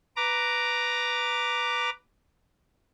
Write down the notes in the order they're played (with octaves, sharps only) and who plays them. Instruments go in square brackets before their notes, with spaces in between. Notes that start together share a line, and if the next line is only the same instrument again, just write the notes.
[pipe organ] B4 A#5 D6